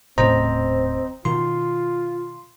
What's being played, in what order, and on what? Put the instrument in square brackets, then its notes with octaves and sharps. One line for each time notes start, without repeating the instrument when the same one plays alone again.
[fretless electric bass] D#1 A2 C#3 [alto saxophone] C4 [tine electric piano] C5 D#5 A#5
[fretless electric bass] B2 D#3 [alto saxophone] F4 [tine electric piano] C6